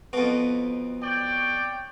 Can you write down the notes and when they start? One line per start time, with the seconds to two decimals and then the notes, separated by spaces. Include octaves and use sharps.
0.13 F2 B2
1.02 C#5 D5 G5